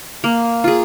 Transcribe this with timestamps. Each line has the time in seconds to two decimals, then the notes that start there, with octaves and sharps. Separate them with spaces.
0.24 A#3
0.64 F4 G#4